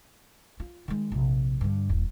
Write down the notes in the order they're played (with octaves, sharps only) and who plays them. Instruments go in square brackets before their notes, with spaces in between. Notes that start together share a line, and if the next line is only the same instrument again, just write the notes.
[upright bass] F4
D#3 G#3
A#1 C3
G2 D3
D#1